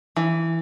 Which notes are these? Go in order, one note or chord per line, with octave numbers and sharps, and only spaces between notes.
E3